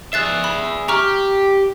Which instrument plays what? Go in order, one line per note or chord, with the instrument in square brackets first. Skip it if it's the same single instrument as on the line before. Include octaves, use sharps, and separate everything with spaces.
[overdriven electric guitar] G#4 E5 [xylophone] F#6 A6 C7
[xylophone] B5
[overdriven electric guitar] G4 [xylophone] A#5 C#6 F6